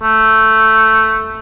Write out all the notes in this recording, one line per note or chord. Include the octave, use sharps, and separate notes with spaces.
A3